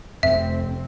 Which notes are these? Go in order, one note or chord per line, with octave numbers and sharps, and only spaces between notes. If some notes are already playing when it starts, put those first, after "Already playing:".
F1 F2 C4 E5